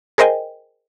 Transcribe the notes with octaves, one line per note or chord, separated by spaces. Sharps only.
G#4 A#4 C5 D#5 G5 G#5